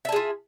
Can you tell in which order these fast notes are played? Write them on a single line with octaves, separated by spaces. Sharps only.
E5 A5 G#4 F4